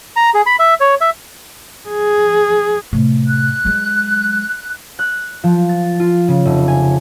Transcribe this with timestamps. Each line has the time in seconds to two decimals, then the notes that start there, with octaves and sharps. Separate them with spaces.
0.16 A#5
0.34 G#4
0.46 B5
0.59 E5
0.80 C#5
1.01 E5
1.89 G#4
2.93 A2 C3
3.28 F#6
3.65 F#3 G#3
4.99 F#6
5.43 F3
5.69 A6
6.00 F4
6.28 C#3
6.45 F1
6.68 G#5